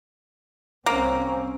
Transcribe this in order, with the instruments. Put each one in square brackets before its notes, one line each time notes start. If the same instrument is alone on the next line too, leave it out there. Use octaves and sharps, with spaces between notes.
[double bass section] C2 C4 C#4 [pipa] A#3